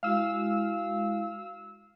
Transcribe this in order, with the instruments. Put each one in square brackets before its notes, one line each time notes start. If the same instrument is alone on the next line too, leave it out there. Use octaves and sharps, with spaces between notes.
[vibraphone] G#3 E4 F#4 [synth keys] F5 E6